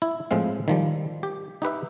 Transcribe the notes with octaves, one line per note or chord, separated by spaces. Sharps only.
E4
A2 F3 G#3 C4 F5
D#3 F3 G3
G4
D#4 G4 B4 E5